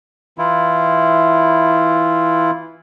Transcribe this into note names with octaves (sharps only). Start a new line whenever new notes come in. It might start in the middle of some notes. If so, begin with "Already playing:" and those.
E3 E4 F4